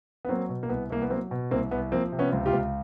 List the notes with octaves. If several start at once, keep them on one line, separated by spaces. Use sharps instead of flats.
B3
F#3 A#3 C4
B2
A#3
C2 B3
C2 A#3
B3
F#3 A#3 C4
B2
C2 A#3 C4
C2 B3
F3 A#3 C4
C3
B3 C#4
C#2
F4 G4
C#2